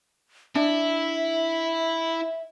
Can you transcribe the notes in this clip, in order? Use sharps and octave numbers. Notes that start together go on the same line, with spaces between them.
D4 E4 E5